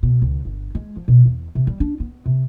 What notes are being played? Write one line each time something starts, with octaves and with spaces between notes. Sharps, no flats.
B2
C#2
G1
G#3
F3
B2
E2
C3
G3
D4
B3
C3